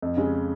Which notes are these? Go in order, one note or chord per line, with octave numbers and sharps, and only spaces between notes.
F2
C#3 G#3